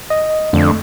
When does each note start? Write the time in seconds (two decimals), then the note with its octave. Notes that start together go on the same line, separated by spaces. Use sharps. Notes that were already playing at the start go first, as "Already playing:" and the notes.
0.10 D#5
0.53 F2 D3 A3